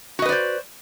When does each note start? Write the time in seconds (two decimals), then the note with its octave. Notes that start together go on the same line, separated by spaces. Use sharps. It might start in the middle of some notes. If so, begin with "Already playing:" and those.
0.19 F#4
0.22 D#5
0.25 B4
0.29 D5
0.32 C5